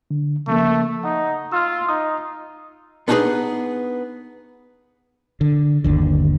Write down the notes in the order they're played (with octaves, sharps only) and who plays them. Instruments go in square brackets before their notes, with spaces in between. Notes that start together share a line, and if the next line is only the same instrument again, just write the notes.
[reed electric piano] D3
[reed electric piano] C#3 F3 A#3 [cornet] A3
[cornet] D#4 [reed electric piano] F#5
[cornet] F4 [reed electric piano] E6 F6
[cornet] D#4 [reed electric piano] D#6
[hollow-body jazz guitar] B3 D4 D#4 G4 G#4 B4
[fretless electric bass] D3
G1 D#2 D3